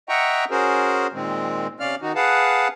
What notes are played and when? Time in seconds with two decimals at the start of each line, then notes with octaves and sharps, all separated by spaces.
0.09 D#5 E5 F#5 G5 A#5 C#6
0.51 C#4 F#4 G#4 A#4 C5
1.13 A#2 D#3 G#3 C4
1.80 C3 C#4 D5 F5 F6
2.02 D#3 D#4 F#4
2.15 G#4 B4 F5 F#5 A5